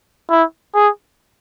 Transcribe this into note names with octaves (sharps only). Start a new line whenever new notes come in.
E4
G#4